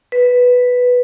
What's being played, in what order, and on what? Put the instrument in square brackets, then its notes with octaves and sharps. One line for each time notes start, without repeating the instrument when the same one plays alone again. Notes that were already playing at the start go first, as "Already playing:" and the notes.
[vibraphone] B4